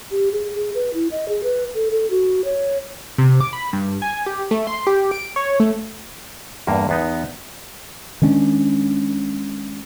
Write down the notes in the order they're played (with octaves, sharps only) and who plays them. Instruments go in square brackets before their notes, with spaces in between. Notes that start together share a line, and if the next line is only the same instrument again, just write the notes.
[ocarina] G4
G#4
G#4
B4
E4
D#5
G#4
B4
A4
A4
F#4
C#5
[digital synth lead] C3
D6
B5
G2
G#5
G4
A3
C6
G4
D7
C#5
A3
[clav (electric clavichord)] E2 G2 A#3
E2 B3 D#4
[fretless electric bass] D#3 G#3 C#4 D4